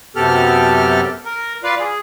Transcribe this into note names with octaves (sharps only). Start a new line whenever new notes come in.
F#2 C3 B3 G4 A4 F6
A#4
F4 B4 D5 F5
G#4